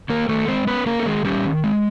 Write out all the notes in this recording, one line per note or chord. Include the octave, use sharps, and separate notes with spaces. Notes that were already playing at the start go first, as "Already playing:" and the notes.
D#3 A#3 A#4
D#3 A3 A4
G#3 C4 C5
B3 C#4 B4
A#3 C#4 A#4
A4
D#3 G#3 G#4
G3 C#4 G4
D#3
G#3